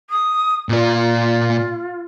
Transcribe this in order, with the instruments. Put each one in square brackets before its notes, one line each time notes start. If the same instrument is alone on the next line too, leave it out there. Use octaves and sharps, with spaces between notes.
[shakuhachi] D#6
[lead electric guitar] A#2 D5 [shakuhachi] F4